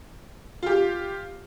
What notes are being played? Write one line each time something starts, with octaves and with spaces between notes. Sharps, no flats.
F4 G4